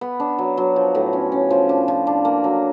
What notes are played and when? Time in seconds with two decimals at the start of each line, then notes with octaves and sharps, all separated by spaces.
0.01 B3
0.20 D4
0.38 F#3
0.57 F#3
0.76 F3
0.95 A2
1.13 C#4
1.32 C#4
1.50 F3
1.69 D4
1.88 F3
2.07 D4
2.25 A#3
2.44 F#3